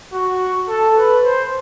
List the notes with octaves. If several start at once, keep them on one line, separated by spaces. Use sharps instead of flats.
F#4
A4
B4
C5